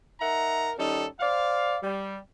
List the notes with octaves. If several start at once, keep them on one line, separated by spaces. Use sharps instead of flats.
D#4 A#4 E5 F#5 A#5
D#3 G3 C#4 D#4 A4
C5 D5 F5
G3